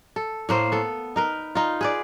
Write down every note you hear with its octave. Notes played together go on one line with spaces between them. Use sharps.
A4
A2 A#3 C5
B3 A4
D#4 A#4 B4
D#4 F4
G#4 B4 D5